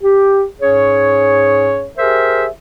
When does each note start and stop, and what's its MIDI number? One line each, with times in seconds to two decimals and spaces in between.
0.01 0.44 67
0.60 1.87 44
0.60 1.87 61
0.60 1.87 68
0.60 1.87 73
1.97 2.46 67
1.97 2.46 68
1.97 2.46 70
1.97 2.46 72
1.97 2.46 76